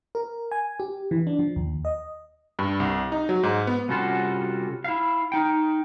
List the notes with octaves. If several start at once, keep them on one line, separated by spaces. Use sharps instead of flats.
A#4
G#5
G4
E3
D4
F3
D#2
D#5
G2
C2
D#4
F#3
G#2
B3
C3 G3 C#4 F4 F#4 A4
E4 F5
D#4 G5